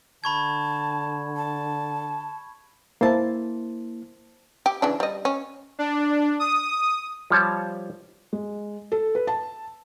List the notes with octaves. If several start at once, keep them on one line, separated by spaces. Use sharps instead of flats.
D3 A5 B5 C#6 G#6
A5
A#3 E4 C5 A5
G4
C#3 E3 D4
G3 D#5
C#4
D4
D#6
F3 G3 C#5 A5
G#3
A4
B4
A5